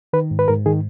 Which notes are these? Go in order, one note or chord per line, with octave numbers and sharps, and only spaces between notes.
D#3 B4
G#2
B4
G#2 A#4
D#3 G#4